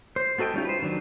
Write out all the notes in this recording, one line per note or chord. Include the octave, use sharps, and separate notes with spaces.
C5
B3 F#4 A4 D#5 G5
G3 C#4 D#4 F4
B4 C5
D#3 F#3 D4